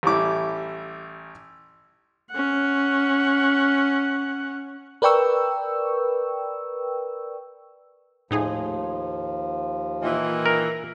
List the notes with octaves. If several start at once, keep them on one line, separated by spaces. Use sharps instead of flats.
A1 G3 E4 D6
C#4 F#5
A#4 B4 D5 G5 C#6 E6
D#2 A2 F3 D#4 G#4
A#2 D#3 E3
A#4